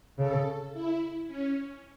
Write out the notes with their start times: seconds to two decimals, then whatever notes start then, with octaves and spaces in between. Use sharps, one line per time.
0.18 C#3 A4
0.73 E4
1.28 C#4